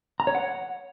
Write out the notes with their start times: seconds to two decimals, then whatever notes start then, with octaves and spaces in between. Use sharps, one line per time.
0.20 A#5
0.27 C#5
0.35 F#5